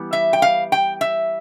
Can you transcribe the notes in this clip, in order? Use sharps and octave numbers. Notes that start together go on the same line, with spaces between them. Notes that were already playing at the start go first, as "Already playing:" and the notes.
Already playing: E3 G3 B3
E5
G5
F5
G5
E5